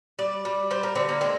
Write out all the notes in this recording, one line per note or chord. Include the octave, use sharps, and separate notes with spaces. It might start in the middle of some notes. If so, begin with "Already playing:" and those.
G3 D5
G3
G3 C5
A#4
D3 C4
A#3
G#3 C4